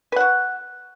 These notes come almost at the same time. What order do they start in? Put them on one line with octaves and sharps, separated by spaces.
B4 F#5 F#4